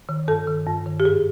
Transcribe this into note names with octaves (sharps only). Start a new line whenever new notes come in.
D#3
G2 A4
D#3
G2
D#3
G4
G#2 G#4